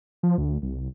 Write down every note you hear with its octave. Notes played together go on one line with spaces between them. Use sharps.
F3
D2
C2